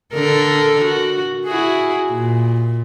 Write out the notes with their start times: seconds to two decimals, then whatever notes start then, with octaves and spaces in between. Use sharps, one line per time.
0.14 D3 A4 A#4
0.85 F#4
1.46 E4 F#4 G#4
2.11 A#2